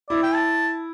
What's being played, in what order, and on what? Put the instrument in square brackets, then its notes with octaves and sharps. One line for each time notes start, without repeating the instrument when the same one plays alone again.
[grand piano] E4 [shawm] D5
[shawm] G5
A5